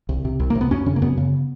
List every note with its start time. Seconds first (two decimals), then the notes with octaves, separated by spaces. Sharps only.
0.09 C2
0.25 C3
0.40 C2
0.50 A#3
0.55 C3
0.61 B3
0.71 F#2 C#4
0.86 C#3 C#4
0.96 A#3
1.02 F#2 B3
1.18 C#3